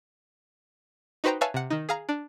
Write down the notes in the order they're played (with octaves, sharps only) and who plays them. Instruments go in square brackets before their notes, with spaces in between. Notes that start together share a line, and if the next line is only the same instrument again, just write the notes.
[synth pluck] D#4 F#4 B4 C5 G5 A#5
B4 C#5 E5 F5 G#5 A5
C3 F#5
D#3 D#4
G#4 F5 A#5
D4